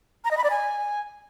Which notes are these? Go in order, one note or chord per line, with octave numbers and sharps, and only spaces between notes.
A#5
D#5
B5
D5
G#5